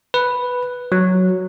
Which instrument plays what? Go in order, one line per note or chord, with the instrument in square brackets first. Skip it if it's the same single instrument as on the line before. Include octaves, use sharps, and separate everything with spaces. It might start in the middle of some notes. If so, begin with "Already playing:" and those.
[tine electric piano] B4
F#3